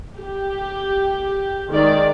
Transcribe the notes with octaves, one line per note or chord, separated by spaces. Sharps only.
G4
D#3 G#3 D5